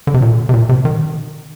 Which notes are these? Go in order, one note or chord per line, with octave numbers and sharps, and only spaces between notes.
D3
C3
A#2
C3
A#2
C3
D#3